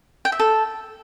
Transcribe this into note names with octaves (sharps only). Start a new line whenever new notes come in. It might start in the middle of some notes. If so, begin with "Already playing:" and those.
G5
E5
A4